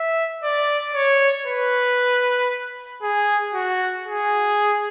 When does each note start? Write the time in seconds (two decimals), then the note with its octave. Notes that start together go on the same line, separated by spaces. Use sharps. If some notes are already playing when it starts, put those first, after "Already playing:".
Already playing: E5
0.43 D5
0.95 C#5
1.46 B4
3.02 G#4
3.54 F#4
4.06 G#4